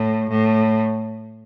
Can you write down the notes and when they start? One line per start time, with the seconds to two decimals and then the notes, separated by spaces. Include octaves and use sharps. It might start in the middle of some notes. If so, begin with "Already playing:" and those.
Already playing: A2
0.30 A2